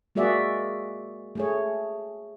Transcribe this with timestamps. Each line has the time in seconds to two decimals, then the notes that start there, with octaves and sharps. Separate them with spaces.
0.15 G#3 A#3 F#4 G#4 D5 E5
1.35 A3 G#4 C#5